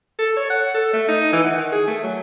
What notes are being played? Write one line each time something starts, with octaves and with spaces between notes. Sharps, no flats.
A4
C#5
F#5
A4
A3
D#4
E3
F#5
D#3
G#4
A3
F#3